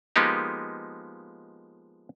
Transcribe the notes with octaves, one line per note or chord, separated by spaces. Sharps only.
F3 G#3 A#3 B3 D#4 G4